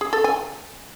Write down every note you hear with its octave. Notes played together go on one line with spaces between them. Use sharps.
G#4
A4
G#5